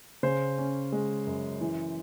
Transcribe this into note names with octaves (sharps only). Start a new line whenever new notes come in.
C#3 C5
C#4
G#3
F#2
E3